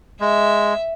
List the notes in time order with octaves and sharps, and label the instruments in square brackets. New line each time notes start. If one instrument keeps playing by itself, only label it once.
[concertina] G#3 [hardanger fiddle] E5